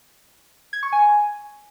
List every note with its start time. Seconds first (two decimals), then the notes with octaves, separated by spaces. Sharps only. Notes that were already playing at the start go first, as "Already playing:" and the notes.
0.73 G#6
0.83 C#6
0.93 G#5